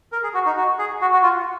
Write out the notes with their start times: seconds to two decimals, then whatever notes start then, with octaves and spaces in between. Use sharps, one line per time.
0.12 A#4
0.23 G#4
0.34 F#4
0.46 D#4
0.57 F#4
0.79 G#4
1.01 F#4
1.13 F#4
1.23 F4